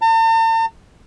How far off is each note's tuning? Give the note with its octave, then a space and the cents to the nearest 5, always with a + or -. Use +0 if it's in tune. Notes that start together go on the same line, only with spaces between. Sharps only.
A5 +45